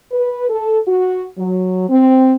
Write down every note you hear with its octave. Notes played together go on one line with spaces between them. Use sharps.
B4
A4
F#4
F#3
C4